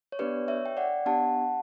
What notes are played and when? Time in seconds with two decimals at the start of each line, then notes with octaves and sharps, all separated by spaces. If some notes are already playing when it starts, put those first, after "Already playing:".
0.12 C#5
0.19 B3 D4 G4 B4 D5
0.48 C#5 E5
0.66 G5
0.77 D5 F#5
1.06 B3 D4 G4 F#5 A5